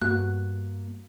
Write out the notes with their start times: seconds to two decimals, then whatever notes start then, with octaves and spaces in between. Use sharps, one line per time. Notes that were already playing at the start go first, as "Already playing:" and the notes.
0.02 G2 A#3 F#4 F#6